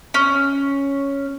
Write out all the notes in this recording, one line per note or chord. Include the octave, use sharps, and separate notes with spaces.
C#4